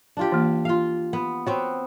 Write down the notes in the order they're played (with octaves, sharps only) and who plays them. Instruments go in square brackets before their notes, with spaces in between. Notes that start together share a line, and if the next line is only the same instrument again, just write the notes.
[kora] D4 F4 G4
[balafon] E3 A#3
[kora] F4 F5
B3
[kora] B3 C4 F#4 [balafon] C#5